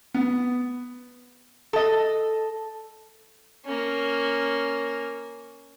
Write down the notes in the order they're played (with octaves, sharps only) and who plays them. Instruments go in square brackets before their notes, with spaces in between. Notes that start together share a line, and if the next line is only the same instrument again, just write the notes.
[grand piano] B3
[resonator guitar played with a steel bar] A4 D#5
[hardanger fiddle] A#3 C#4